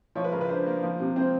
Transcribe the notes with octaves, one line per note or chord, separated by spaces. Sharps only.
F3 C#5
B4
C#3 A#4
B4
D4 C5
A#3
F3
C3
C4 C5